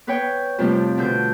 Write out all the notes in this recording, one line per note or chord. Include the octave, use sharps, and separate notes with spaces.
B3 B4 C#5 G5
F2 C3 G3 A3 F4
B2 D3 G6